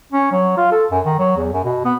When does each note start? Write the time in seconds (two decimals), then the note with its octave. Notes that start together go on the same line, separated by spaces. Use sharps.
0.12 C#4
0.32 F#3
0.57 F4
0.72 A4
0.91 F#2
1.06 D#3
1.19 F#3
1.37 E2
1.53 F#2
1.64 B2
1.85 B3